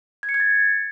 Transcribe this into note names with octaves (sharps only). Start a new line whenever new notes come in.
G#6
C#7
G#6
A6